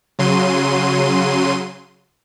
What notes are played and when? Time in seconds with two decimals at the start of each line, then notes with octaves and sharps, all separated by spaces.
0.19 C#3 F#3 C6 D#7